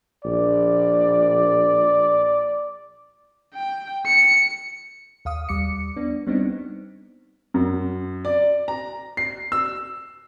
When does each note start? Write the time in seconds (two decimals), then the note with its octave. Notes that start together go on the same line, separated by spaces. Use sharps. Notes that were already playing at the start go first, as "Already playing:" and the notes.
0.25 A#1 D5
3.54 G5
4.07 C#7
5.25 D#2 F5 D#6
5.49 D#2 G3 D6 C#7
5.96 B3 D4
6.27 G3 B3 C4 D4 D#4
7.54 F#2
8.25 D5
8.68 A#5
9.17 C7
9.52 E6